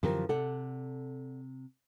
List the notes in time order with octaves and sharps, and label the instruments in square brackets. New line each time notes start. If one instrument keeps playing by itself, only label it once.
[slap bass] F#2 D3 E3 [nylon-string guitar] F3 G4 A#4
[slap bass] C3 [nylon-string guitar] A4 D5 F#5